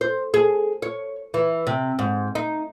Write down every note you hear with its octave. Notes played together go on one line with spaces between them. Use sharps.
C5
G#4
C#5
E3
C3
G#2
D#4